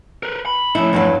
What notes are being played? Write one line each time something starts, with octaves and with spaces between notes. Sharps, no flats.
A#4 B4
B5
F3 A3 C#4 E4
E2 G2 F#3